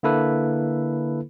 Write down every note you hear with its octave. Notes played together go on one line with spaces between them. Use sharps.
D3 A#3 E4 A4 B4